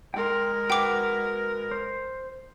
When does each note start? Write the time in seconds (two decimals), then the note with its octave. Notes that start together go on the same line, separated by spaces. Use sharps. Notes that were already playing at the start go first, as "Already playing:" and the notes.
0.14 G#3 A#4 G5 C6
0.70 F#4 B4 G5 D6
1.71 C5